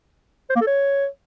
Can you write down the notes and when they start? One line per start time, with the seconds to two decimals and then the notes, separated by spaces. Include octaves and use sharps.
0.50 C5
0.56 A#3
0.61 A4
0.67 C#5